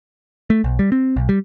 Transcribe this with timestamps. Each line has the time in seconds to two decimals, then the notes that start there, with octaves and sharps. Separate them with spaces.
0.50 A3
0.64 B1
0.79 G3
0.92 C4
1.16 B1
1.29 G3